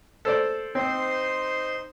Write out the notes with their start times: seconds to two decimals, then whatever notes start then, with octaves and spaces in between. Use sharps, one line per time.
0.25 A4 C5 D5
0.75 C4 D#4 C5 C6